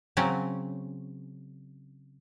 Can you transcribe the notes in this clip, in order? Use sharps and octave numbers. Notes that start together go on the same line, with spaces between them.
C#3 F#3 C4 C#4